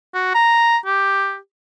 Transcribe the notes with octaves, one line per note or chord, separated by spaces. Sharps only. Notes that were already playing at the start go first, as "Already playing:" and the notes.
F#4
A#5
G4